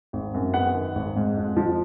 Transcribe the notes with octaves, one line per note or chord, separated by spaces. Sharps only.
G#1
F#2
B3 F#5
D#3
G#1
G#2
F2
F3